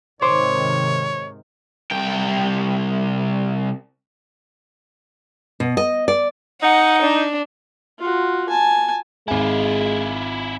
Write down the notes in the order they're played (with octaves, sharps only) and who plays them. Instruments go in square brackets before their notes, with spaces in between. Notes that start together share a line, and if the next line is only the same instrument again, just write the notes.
[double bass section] G#2 C3 D#3 [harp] C5 D6 [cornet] C#5
[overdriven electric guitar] C2 G5
[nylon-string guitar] B2
D#5
D5
[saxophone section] D#4 [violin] F#5
[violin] D4
[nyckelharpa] F4 F#4
G#5 A5
[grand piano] G#1 G#5 [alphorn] G#3 [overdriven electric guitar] E4 F4